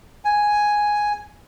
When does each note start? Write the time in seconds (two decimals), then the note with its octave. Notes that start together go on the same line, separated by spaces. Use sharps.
0.25 G#5